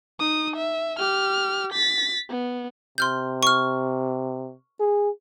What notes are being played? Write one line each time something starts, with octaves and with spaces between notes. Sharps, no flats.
D#4 D#6
E5
G4 F6
A6 B6
B3
C3 C6 F6 G6
C#6 F6
G#4